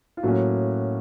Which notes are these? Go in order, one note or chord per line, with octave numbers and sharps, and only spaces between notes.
F4
A2 F#3 A#3 C#4 F#4